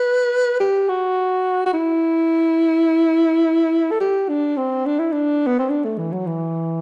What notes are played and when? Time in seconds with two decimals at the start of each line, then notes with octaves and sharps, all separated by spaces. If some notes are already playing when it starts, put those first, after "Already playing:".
Already playing: B4
0.60 G4
0.89 F#4
1.66 F#4
1.73 E4
3.91 A4
4.01 G4
4.29 D4
4.57 C4
4.86 D4
4.99 E4
5.12 D4
5.47 B3
5.59 C4
5.70 D4
5.85 A3
5.98 E3
6.12 F#3
6.27 E3